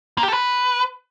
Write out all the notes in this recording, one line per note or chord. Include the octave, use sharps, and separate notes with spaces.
A#3
G4
A4
B4